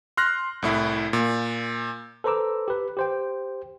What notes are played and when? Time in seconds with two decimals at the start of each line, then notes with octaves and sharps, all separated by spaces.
0.17 C6 F6 F#6 A#6
0.62 C2 A2 E4
1.13 A#2
2.24 A4 B4 C5 A#5 D6 E6
2.68 G4 B4
2.97 G4 C5 G5